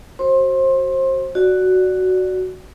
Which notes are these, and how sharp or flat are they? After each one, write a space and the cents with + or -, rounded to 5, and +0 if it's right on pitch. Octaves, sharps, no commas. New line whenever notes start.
F#4 +15 C5 +25 C6 +25
F#4 +5 D5 +0